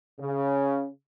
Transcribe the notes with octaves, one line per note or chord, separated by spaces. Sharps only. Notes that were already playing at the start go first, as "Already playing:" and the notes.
C#3